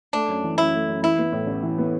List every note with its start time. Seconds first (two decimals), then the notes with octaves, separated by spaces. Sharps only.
0.13 A3 D4
0.29 F#2
0.44 E3
0.58 F#2 E4
0.73 A3
0.88 F#2
1.03 E3 E4
1.18 B3
1.32 A2
1.47 A1
1.63 E3
1.78 B3